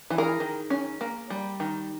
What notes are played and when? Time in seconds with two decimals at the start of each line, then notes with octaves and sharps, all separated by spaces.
0.10 E3
0.18 G#4 A#4
0.40 D#3
0.70 C#4
1.01 A#3
1.30 G3
1.60 D#3